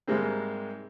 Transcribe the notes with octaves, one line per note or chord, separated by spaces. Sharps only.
G#2 C3 G3 G#3 A#3 C4